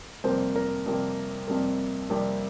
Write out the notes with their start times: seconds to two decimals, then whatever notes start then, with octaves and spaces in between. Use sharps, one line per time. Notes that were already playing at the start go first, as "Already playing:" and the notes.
0.24 F2 C3 G3 A#3 C5
0.56 A#4
0.86 F2 C3 G3 A#3
1.48 F2 C3 G3 A#3
2.10 F2 C3 G3 A#3